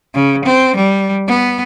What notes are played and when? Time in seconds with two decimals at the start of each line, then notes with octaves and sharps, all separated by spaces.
0.14 C#3
0.45 C4
0.76 G3
1.27 B3